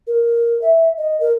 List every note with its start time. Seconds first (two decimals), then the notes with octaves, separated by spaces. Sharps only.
0.07 A#4
0.62 E5
0.97 D#5
1.20 A#4